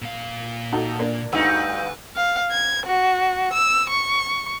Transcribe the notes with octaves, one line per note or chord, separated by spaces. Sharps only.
A#2 F5
D#4 F#4 A4
A#3 D4
D2 G2 D#4 B4 F#5 E6
F5
G#6
F#4
E6
C#6